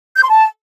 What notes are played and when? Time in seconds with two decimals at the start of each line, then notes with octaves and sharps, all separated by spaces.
0.16 G6
0.23 C6
0.29 A5